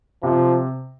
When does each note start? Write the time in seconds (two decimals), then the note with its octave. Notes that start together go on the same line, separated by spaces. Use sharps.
0.23 C3 F3